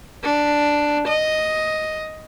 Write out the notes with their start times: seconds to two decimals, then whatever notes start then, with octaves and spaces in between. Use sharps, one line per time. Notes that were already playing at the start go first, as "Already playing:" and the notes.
0.24 D4
1.08 D#5